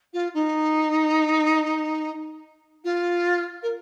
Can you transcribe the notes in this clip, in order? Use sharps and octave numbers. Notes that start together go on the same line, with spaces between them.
F4
D#4
F4
A#4